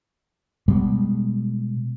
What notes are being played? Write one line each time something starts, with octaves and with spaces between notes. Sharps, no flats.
B2 G3 G#3